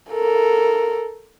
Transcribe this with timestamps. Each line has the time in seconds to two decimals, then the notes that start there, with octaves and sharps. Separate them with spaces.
0.11 A4 A#4